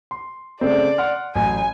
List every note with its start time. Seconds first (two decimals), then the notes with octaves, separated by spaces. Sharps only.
0.11 C6
0.61 C#3 A3 C4 D5
0.98 F#5 C6 F6
1.35 A1 F#3 G#5